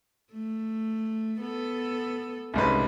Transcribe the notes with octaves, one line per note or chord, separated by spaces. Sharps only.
A3
B3 A4
C2 G#2 C#3 B4